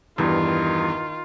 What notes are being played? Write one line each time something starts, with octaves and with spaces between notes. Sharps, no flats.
E2 G2 D#3 F4